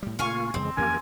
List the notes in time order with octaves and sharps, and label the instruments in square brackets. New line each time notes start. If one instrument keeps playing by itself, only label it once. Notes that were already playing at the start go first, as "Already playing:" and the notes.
[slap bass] A2 G3
[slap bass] A#2 C#3 A3 [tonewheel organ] A#3 F4 [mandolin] F5 G#5 C#6
[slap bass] F2 E3 [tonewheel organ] C#3 G#3 [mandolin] C4
[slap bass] F2 E3 C#4 [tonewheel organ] A#3 G4 A#4 [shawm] G#5